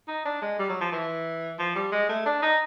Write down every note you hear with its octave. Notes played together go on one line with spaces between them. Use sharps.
D#4
D4
G#3
G3
F#3
F3
E3
F3
G3
G#3
A3
D4
D#4